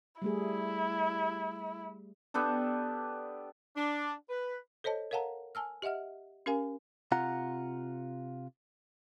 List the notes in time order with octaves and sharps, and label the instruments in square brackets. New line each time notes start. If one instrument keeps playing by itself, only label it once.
[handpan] G3 A3 G#4 [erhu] E4
[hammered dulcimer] B3 D4 G4 A4
[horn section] D4
B4
[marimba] A4 C5 C#5 D#5 A5
A#4 C#5 F5 F#5 A5 A#5
G#5 A5 E6 F6
G4 D#5 E5 F#5 F6
C#4 G4 A#4 F5 G#5
[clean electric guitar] C3 F4 F#5 A#5